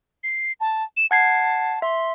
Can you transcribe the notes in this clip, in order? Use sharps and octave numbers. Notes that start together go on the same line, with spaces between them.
C7
A5
E7
F#5 A5 G#6 C7
E5 C6